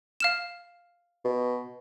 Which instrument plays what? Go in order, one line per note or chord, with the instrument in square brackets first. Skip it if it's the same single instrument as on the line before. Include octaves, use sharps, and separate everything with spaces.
[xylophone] F5 F6 E7
[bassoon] B2